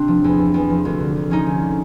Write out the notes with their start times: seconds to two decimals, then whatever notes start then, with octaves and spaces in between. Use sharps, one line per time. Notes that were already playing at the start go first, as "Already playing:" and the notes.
Already playing: C3 C4 D4
0.08 F3
0.24 E2
0.39 C3
0.54 E2
0.70 F3
0.85 D2
1.00 D3
1.16 D2
1.30 F3 C#4 D#4
1.47 D2
1.62 D3